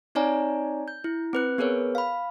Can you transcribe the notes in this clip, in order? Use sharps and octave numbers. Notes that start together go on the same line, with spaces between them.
C4 D#4 C#5 D5 G#5 A#5
G6
E4
C4 B4 F#6
B3 G#4 A#4 B4 C#5
F5 B5